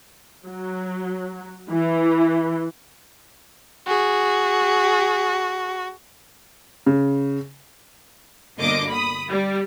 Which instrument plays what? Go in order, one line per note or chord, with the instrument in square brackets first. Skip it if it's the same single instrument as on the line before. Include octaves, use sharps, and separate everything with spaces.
[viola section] F#3
E3
[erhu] F#4 [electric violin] G#4
[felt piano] C#3
[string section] G1 B2 D3 A#3 D#5 D6
B5 D#6
G3